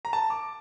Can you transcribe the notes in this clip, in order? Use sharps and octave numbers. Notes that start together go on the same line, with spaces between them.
A#5
A5
D6